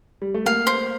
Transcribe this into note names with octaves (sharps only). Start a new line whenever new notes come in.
G3
A3
A#3 F5
C5